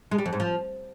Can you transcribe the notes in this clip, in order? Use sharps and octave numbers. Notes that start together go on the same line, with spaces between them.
G#3
G3
F2
G#2
F3